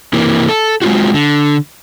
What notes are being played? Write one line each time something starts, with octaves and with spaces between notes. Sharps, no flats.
C3 E3 A#3
A4
G#3 C4 F4 F#4
D3